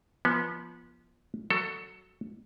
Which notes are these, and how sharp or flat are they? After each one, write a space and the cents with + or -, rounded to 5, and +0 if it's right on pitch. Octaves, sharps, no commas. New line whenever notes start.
F3 -15 B3 -30
F#3 +0 A4 +15